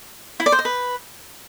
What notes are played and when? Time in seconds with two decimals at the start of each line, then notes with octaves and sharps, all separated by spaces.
0.40 E4
0.46 D5
0.52 C5
0.59 D#5
0.65 B4